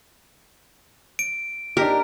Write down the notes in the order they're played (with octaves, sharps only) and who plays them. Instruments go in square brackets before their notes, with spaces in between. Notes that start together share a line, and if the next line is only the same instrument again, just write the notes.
[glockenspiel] D7
[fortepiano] D4 D#4 G4 [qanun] A#4